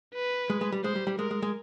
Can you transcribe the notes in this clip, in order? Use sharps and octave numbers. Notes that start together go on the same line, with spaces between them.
B4
G#3
G#3
G3
G#3 C5
G3
G3
G#3 A#4
G#3
G#3